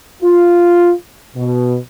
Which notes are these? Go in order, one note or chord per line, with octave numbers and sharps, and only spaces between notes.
F4
B2